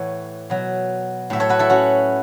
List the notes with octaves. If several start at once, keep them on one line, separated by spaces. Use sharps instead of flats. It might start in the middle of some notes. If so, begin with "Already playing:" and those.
Already playing: A2 E3 C#5 F#5
B2 F#3
A2 F#3 E5
A4 C#5
F#4 B4
E4 A4
C#4 F#4